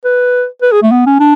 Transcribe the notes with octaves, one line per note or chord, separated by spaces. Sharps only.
B4
B4
G#4
A3
B3
C#4
D4